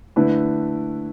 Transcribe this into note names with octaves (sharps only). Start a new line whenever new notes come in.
D3 A3 E4 B4